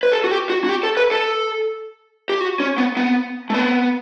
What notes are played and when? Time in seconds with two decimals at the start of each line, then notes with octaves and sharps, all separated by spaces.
0.03 B4
0.12 A4
0.24 F#4
0.31 G4
0.50 F#4
0.64 F#4
0.69 G4
0.83 A4
0.97 B4
1.11 A4
2.29 G4
2.41 F#4
2.60 C#4
2.78 B3
2.97 B3
3.50 A3
3.54 B3